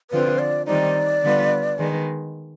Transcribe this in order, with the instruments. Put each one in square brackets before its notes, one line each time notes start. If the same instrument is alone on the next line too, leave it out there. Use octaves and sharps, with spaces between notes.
[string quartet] D3 F3 C4 F4 [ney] B4
[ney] D5
[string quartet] D#3 G3 C4 D#4 [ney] D5
[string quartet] D3 G3 B3 F4 B4
D#3 G#3 B3